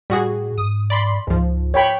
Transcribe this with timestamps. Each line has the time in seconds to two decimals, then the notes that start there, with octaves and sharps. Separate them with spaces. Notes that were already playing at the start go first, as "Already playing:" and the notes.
0.10 A2 G3 F#4 G#4
0.58 G#2 D#6
0.90 D5 B5 C6
1.27 C#2 G#2 F3
1.74 C#5 G5 B5